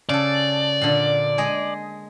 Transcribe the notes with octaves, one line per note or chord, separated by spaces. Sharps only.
C#3 A4 D5
A#2 D3
G#3 G#4 D#5